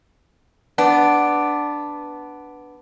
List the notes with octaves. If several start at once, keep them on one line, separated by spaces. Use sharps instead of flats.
B3 D4